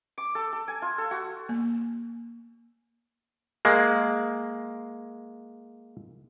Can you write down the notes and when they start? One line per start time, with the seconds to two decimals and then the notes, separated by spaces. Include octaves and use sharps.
0.18 D6
0.35 A4
0.53 A4
0.68 G#5
0.82 F4
0.98 A4
1.11 F#4
1.49 A#3
3.65 G#3 A#3